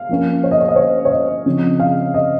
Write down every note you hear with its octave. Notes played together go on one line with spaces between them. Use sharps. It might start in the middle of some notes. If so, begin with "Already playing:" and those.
Already playing: F5
F3 A#3 C#4
C#5
D#5
C#5
D#5
C#5
C#5
D#5
C#3 F3 C4
F5
D#5